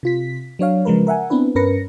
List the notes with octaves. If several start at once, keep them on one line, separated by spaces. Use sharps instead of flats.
C3 F4 B6
F#3 D4 C#5 F5
C#3 F3 G#3 A#4 B4
A#4 E5 F#5 G#5
B3 C4 D4 E4 B4
G2 C#4 A#4 B4 A#6 C#7